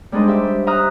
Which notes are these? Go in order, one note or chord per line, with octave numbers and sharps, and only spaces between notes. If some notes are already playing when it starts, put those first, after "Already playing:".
G3 G#3 D4 D#4 C5 D#5
G4 E5
C5 E5 A#5 D#6 F6 F#6